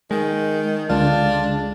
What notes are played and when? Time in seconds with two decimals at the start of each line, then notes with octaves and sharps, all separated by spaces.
0.11 D#3 G#3
0.90 C#2 D3 G#3 D4 F4 G#4